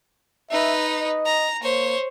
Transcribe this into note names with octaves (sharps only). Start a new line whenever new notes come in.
D#4 B4 E5
D#5
A#5
A#3 C5 C#5